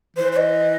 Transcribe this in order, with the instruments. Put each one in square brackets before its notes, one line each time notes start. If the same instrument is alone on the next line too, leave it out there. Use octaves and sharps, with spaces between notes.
[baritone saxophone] E3 [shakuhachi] C5
[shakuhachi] C5
D#5